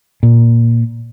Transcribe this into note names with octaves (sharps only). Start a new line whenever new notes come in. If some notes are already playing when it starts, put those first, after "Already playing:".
A#2